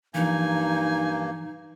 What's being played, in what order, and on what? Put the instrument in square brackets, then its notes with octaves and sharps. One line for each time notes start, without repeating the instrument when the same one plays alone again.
[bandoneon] G2 A#3 [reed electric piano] E3 F3 [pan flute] D#4 [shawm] G#5